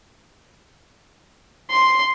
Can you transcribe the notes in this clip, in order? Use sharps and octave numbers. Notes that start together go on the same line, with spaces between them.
C6